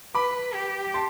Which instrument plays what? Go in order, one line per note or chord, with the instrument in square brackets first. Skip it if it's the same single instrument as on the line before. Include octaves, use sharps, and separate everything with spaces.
[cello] B4 [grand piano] B5 D6
[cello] G4
[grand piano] A5 C6